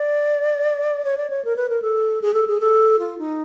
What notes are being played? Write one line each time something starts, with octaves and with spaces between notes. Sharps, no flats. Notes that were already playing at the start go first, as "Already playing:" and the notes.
Already playing: D5
C#5
D5
C#5
A#4
B4
A#4
A4
G#4
A4
G#4
A4
F4
D#4